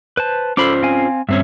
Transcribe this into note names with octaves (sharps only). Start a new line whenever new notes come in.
B4 C5 A5
C#4 F4 A4 C5 B5 D6
C4 F5 G#5
G2 C4 C#4 E5